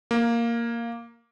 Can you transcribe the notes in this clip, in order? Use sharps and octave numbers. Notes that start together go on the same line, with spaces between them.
A#3